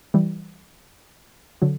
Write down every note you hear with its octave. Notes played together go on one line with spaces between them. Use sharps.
E3 G3
D3 F#3